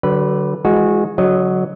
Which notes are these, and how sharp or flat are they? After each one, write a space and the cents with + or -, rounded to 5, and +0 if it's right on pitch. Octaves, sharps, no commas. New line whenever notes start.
D3 +0 F#3 +35 B4 -10
E3 +20 G#3 +0 F#4 -20
D3 -45 F#3 +0 D#5 -15